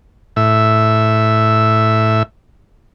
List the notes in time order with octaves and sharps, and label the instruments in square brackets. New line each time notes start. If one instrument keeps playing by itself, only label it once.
[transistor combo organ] A2 E5